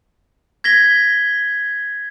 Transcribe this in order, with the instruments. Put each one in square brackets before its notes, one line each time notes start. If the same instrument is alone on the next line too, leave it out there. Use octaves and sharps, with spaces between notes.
[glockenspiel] G#6 A#6 B6 G7